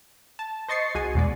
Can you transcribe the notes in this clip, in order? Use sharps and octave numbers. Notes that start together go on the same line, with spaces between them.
A5
C5 D#5 C#6 A6 C7 C#7
C2 F#4 G#4 G#5
E2 B2 G#3 D5